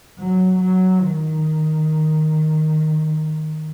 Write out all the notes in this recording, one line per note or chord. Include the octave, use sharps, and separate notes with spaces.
F#3
F#3
D#3